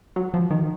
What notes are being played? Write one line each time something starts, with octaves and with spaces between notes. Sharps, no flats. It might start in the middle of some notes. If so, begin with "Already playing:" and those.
F#3
F3
D#3